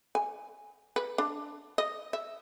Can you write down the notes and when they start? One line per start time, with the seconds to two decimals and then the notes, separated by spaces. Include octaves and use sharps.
0.15 G#5
0.96 B4
1.18 D4
1.78 D#5
2.13 E5